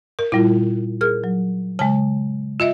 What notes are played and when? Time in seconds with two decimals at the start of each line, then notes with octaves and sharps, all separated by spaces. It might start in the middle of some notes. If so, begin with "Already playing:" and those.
0.19 A#4
0.32 A#2 G3 E4 F4
1.01 G#4 A#4 F6
1.24 F#3
1.79 C#3 G#3 A5
2.60 F4 D#5 E5